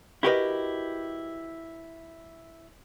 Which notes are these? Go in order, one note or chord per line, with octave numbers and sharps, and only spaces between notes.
E4 F#4 G4 A#4 B4 D#5